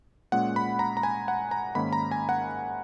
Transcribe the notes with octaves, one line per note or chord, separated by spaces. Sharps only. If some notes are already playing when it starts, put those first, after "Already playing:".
A#2 G#3 C#4 F#5
B5
A#5
A#5
G#5
F#5
A#5
G#2 D#3 A#3 C#4 B5
A#5
G#5
F#5